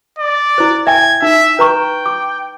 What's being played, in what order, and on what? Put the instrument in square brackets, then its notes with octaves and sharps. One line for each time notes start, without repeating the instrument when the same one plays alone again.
[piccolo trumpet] D5
[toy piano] E4 C5
[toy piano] E5 G5 G#5 [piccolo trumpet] G#6
[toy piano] D#4 [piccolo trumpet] E5
[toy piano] B4 A#5 C#6 [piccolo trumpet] G5
[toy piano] D6